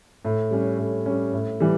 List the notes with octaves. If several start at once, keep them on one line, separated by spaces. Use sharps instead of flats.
A2
G3 C#4
A2
G3 C#4
A2
E3 G3